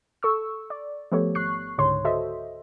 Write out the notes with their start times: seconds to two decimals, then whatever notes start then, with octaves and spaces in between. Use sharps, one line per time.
0.23 A4 C#6 E6
0.70 D5
1.12 F3 A3 B3 G4 A4 C#5
1.35 G#1 C#6 F#6 C7
1.78 C#2 G#2 D3 C#5 C6
2.05 F#4 A4 C5 D#5 E5